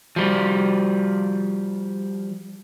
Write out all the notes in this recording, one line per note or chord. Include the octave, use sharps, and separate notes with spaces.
F3 G3